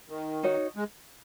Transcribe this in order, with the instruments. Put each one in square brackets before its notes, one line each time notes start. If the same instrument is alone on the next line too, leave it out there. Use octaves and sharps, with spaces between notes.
[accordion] D#3
[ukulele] D#4 F#4 C#5
[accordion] G#3